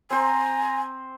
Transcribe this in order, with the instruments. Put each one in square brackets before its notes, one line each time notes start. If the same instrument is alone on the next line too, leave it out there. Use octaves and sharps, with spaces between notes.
[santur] C4 C5 [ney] G#5 [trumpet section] A#5